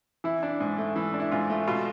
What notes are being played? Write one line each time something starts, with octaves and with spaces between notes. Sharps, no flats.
E3 E4
D4
G#2
A3
E3
D4
E4
G#2 F4
A3
B2 F4